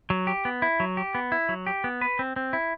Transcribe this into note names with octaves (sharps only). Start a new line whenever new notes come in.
F#3
G4
B3
E4
F#3
G4
B3
E4
F#3
G4
B3
B4
C4
C4
E4